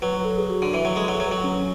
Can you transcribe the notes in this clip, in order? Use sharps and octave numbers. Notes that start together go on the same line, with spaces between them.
F#3 B4
B4
A4
G#4
F#4
D3
E3
F#3 B4
G#3 A4
F#3 A4
F#3 B4
F#3 A4
C#4